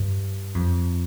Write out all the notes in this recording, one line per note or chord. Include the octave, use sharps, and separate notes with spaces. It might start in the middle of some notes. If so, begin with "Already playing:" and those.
Already playing: G2
F2